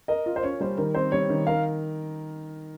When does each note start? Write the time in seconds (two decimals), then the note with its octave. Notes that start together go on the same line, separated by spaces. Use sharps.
0.08 A#4 D#5
0.26 F4
0.36 C5
0.43 C#4 C#5
0.61 G3 C5
0.78 D#3 A#4
0.95 C4 C5
1.12 G3 C#5
1.30 D#3
1.47 A#4 F5